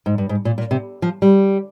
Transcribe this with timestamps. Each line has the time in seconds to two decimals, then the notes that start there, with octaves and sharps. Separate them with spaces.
0.06 G#2
0.18 G2
0.29 G#2
0.45 A#2
0.58 A#2
0.71 C3
1.02 F3
1.22 G3